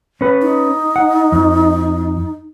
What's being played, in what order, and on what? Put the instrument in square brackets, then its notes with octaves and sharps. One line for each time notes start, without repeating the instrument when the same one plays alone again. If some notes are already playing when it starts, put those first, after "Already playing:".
[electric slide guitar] C#4 B4
[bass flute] D#4
[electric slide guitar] F#5
F2